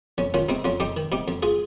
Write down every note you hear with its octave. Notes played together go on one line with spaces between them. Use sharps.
F2 C#4
D#3 C#4 F4
C3 C4 D#4
F2 C#4 F4
F2 D#4 G4
D#3
C3 D#4 G4
F2
F4 G#4